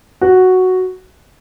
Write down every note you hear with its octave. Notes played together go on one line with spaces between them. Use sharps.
F#4